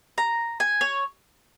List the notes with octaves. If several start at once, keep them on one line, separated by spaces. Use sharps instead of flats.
A#5
G#5
C#5